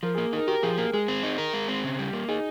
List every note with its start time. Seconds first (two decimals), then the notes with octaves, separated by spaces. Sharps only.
0.03 F3 A#4
0.15 G#4
0.18 A#3
0.33 D#4 A#4
0.47 G4 A#4
0.63 F3 G#4
0.78 A#3 A#4
0.94 G#3 G#4
1.08 C4
1.23 D#4
1.38 A#4
1.54 G#3
1.68 C4
1.84 C#3
1.99 G3
2.13 A#3
2.29 D#4 G#4